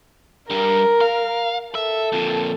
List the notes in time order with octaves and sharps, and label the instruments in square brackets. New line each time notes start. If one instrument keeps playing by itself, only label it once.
[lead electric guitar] G2 G3 [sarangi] A#4
[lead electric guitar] F5
[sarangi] A4 [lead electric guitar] E5
[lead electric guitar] F2 A#2